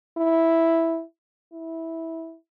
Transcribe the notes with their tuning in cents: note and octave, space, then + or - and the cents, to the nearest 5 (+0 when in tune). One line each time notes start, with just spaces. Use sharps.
E4 -5
E4 -15